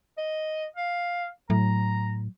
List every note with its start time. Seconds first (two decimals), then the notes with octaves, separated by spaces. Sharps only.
0.17 D#5
0.76 F5
1.50 A2 F#3 A#5